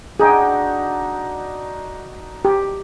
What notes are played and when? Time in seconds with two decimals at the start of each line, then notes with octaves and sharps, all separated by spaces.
0.20 D4 D#4 F#4 G#4 G5
2.45 G4